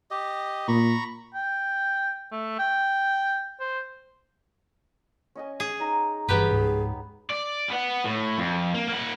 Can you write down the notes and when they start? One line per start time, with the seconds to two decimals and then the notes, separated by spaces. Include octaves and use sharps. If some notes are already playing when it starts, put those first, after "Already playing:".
0.11 G4 D#5
0.68 A#2 A#5 B5 C#6
1.34 G5
2.32 A3
2.59 G5
3.60 C5
5.35 C#4 D#5 G#5
5.60 G#4
5.80 D#4 A#5
6.29 G1 G2 E3 B3 G4 G#4 B4
6.51 C#2 G#2
7.30 D5
7.69 B3 F#5
8.05 A2
8.38 F2
8.74 A#3
8.88 A#3 F#5